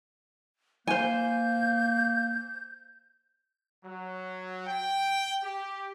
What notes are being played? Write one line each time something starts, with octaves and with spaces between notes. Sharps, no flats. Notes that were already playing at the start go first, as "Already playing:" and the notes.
A#3 C5 G#5 G6
F#3
G5
G4